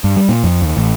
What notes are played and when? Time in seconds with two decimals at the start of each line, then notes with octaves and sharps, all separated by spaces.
0.04 G2
0.16 G3
0.29 A#2
0.44 F2
0.62 D#2
0.77 A1